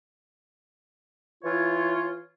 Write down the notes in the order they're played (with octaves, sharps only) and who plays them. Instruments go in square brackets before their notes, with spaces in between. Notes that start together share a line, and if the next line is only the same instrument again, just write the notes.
[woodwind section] E3 F4 C#5